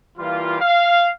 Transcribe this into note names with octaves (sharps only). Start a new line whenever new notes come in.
E3 G3 A#3 F4
F5